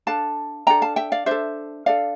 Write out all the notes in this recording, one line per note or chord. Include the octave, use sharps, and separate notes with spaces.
D4 A4 F5 A5
D4 A4 G5 A#5
F5 A5
E5 G5
D5 F5
D4 A4 C5 E5
D4 A4 D5 F5